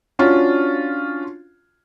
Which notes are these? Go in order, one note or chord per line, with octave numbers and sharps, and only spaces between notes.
C#4 D4 F4 F#4